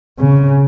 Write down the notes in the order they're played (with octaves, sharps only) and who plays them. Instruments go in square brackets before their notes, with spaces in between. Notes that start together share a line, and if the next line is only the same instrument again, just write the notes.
[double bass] C#3